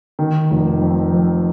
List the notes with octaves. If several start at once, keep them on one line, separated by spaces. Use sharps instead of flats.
D#3
F1
F2
F2